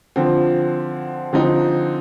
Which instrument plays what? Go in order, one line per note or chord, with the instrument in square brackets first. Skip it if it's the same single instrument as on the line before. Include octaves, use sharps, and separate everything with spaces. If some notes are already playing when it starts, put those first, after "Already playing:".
[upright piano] D3 F3 C4
D3 F3 C4 D#4